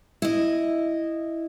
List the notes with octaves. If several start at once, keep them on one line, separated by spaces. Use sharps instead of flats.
E4 D#5